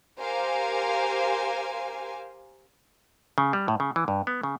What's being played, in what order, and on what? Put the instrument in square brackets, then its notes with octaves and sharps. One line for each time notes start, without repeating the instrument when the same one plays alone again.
[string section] G4 A#4 C5 F5 G#5
[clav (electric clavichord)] C#3
G3
A2
C#3
E3
G2
B3
C#3